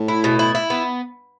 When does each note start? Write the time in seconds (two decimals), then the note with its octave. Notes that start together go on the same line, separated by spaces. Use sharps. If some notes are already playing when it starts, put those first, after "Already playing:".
Already playing: A2
0.08 E4
0.24 B2
0.39 E4
0.55 E4
0.70 B3